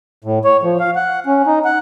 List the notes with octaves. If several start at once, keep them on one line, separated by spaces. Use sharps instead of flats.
A2
C#5
F3
F5
F#5
C#4
D#4
F#5